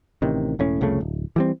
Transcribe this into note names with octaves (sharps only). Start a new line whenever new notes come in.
A1 C3 D#3
E1 A2 C#4
C2 F2 C#3 A3
D1
E3 G3 C4